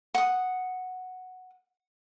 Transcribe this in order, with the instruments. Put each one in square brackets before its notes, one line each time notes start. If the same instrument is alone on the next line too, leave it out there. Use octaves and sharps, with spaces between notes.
[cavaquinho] F#5 D#6